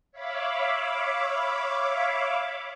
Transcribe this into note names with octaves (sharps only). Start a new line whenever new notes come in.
C#5 E5 F5 B5 D6